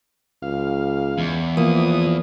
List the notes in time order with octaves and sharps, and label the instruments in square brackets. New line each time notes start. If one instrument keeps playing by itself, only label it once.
[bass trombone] C#2 [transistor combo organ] F5
[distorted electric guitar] E2
[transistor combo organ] E3 D#6 [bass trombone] F3 [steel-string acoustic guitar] A#3